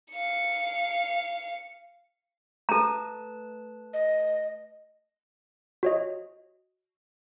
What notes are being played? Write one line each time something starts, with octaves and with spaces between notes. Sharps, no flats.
F5 C#7
A3 A4 B4 A5 A#5
D#5
F#4 C#5 D#5